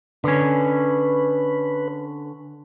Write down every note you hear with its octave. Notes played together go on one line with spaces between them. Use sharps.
D3 C#4 B4